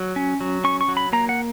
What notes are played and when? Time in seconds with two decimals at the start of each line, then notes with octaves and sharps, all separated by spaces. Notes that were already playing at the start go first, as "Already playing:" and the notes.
Already playing: F#3
0.16 C#4
0.41 F#3
0.64 C#4 C#6
0.81 C#6
0.88 F#3
0.97 B5
1.13 A#3 A#5
1.29 F#5